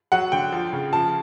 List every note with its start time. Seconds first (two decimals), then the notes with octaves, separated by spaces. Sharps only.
0.12 F#3 F#5
0.32 D3 G5
0.52 F3
0.73 C#3
0.93 F3 A5